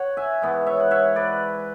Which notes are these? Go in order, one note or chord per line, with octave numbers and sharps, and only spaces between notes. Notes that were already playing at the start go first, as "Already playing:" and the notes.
Already playing: C#5 F#5
E5 G#5
G#2 E3 B3
C#5 E5
F#5
C#5 E5
B4 D5